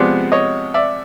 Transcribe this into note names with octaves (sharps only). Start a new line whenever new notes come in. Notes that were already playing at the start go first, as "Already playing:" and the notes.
Already playing: C3 F3 G#3 B3 C5 D5
C#5 D#5
D5 E5